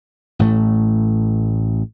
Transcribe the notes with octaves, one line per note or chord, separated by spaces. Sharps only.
A1 A2 A3